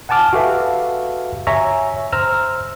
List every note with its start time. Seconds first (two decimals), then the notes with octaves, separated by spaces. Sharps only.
0.09 F#5 G#5 A5 D6 F6
0.33 F#4 G4 A4 B4 E5 F5
1.47 C#5 E5 G#5 A#5 C#6
2.13 C5 A#5 E6 F6